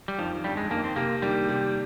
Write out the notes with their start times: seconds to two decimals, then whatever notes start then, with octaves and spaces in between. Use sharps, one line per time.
0.08 G3
0.19 F2 D#3 F3
0.44 G1 G3
0.57 G#3
0.70 F2 D#3 A#3
0.84 C4
0.96 C3 A#3
1.22 D#3 G3 A#3
1.49 C3